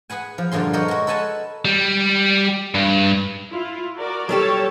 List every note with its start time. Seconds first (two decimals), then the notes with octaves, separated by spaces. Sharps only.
0.10 G#4 B4 F#5 G#5
0.38 F3
0.51 G2 A#2 D3 F3 G#4 C6
0.73 A4 A#4 C#5 D#5 F#5 G5
0.88 G#3 F#4
1.07 A4 B4 F#5 G#5 A5
1.65 G3
2.75 G2
3.50 E4 F4
3.95 F#4 A#4 D5
4.29 F#3 G3 G4 A4 C#5 A5